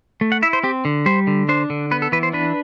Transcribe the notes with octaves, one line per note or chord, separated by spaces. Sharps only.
A3
F#5
E4 E5
C5
C4 G4
D3
G3 C5
D3
D4 C5
D3
B3 B4
A4
E3 B4
C5
D4 B4